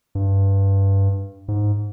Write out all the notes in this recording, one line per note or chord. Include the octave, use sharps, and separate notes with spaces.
G2
G#2